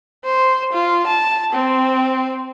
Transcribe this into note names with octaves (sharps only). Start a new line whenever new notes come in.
C5
F4
A5
C4